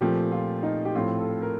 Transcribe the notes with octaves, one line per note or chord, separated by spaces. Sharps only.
A#2 F3 A3 C4 G4
F4
D#4
G4
A2 F3 A3 C4 F4
A4
A#4